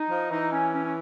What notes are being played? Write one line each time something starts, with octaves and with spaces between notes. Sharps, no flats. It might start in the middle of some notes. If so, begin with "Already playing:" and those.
Already playing: D#4
F3
E3 D#4
C#4
C#4
C#4